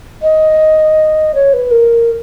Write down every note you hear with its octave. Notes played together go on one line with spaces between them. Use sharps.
D#5
C#5
B4
A#4